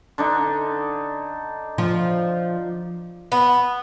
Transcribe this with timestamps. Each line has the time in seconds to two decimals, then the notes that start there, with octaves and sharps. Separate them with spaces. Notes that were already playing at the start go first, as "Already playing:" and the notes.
0.18 D3 D4 D#4
1.78 F3
3.32 B3